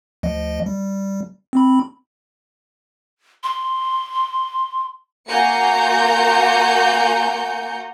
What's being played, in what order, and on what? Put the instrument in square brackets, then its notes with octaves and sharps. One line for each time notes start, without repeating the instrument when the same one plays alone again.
[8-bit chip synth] D2 F3 D#5
G3
C4 B5
[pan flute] C6
[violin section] A#3 F#4 G#5 A#5 G6 C#7